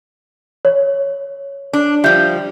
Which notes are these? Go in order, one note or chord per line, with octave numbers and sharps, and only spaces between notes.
C#5
D4
F3 G3 E5 G6